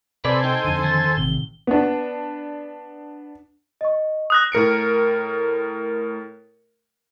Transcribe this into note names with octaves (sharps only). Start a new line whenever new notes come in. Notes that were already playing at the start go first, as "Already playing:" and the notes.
C3 A4 B4 C5 D5 G#5
D#4 G5
F2 D3 D#7
D#3 A6
A1 C3 G7
B3 D4
D#5 C#6
D#6 F#6 A#6
A2 A#4 C#7 D7